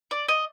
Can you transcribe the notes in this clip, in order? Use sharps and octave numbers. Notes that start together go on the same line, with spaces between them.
D5
D#5